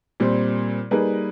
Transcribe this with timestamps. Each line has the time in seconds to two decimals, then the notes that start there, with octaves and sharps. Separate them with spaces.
0.20 A#2 G3 C4
0.91 G3 A#3 D#4 G#4 B4